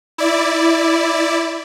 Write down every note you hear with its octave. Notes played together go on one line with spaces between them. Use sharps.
E4 D5